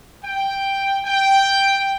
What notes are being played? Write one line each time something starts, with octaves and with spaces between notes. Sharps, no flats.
G5
G5